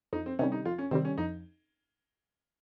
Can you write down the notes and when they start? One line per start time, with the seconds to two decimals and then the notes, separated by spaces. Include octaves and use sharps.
0.13 F2 D#4
0.26 C4
0.39 C3 D#3 G3 C#4
0.52 D#4
0.65 F2 F4
0.78 C#4
0.91 C3 D#3 G3 C4
1.05 C#4
1.18 F2 D#4